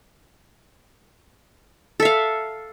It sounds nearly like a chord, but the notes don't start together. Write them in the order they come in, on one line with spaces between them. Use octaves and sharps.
A4 E5 F5